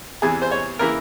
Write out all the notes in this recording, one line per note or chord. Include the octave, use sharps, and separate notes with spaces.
E2 C3 E3 G#4
C5
C#5
C#3 E3 A#3 E4 A#4